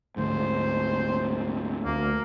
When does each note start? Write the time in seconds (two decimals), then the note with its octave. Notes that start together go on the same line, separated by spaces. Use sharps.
0.17 D2 G#2 C5
1.85 D2 A#3